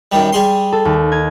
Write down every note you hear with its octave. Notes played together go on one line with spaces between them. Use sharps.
F#2 D#3 G3
G3 G#4 C6
A4
D#2
D#4 G#6